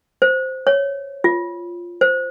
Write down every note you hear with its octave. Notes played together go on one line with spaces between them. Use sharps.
C5
C#5
F4
C5